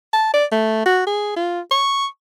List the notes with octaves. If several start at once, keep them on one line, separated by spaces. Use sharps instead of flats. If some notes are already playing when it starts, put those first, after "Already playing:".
A5
D5
A3
F#4
G#4
F4
C#6